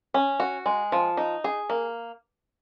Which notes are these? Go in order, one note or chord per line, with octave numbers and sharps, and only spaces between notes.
C#4
F#4
G#3
F3
D#4
G#4
A#3